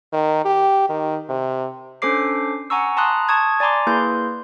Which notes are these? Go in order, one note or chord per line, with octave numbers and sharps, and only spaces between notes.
D#3
G4
D#3
C3
C#4 D4 A4 C5 D6 C7
F#5 G#5 A#5 C#6 E6
A5 A#5 C6 D#6 F#6
A5 C#6 D#6 G#6
D5 G#5 A#5 C6 D6
A#3 E4 G#4 B4 C6 G6